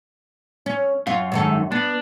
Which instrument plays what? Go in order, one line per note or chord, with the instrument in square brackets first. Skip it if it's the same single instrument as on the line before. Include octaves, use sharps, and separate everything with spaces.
[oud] C#4
[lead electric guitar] F#2 [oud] F4
[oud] G#2 D#3 A4
[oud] B3 [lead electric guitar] D4